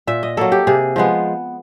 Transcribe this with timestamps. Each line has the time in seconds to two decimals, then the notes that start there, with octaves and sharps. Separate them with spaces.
0.07 A#2 E5
0.23 D#5
0.37 F#3 A#3 A4
0.52 G4
0.67 C3 G#4
0.96 F3 G#3 B3